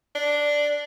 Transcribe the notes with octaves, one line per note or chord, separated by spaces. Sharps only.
D4